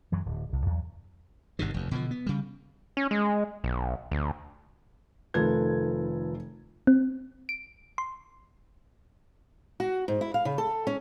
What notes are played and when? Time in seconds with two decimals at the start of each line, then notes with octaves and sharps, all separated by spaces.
0.12 F#2 E3 F#3
0.26 D1
0.52 C2
0.66 E2 F#3
1.59 G#1 G2 C3 D#3
1.74 F1 D#2
1.91 B2 D3 F3
2.11 B3
2.26 C#3 G3
2.97 C#4
3.11 G#3
3.64 B1
4.11 D2
5.34 F1 D#3 F4 A4 B4 G#6
6.87 C4
7.49 D7
7.98 C6
9.80 F#4
10.08 G#2
10.21 E4
10.34 F5
10.45 C#3
10.58 A4
10.87 C#4